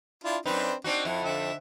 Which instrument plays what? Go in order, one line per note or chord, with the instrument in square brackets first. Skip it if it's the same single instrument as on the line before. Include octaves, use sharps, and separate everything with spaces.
[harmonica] D4 E4 F4
[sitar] F#2 D#4 [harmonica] C4 D4 B4
[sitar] C4 D#4 F#4 [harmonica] D4
[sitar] F2 [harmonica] E4
[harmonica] D3 E5